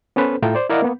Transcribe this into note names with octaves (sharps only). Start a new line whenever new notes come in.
B3 C#4 A4 B4 C5
A2 F4 A4 E5 G5 A#5
C5 D5
E4 A#4 D5 D#5 F5 F#5
A#3 B3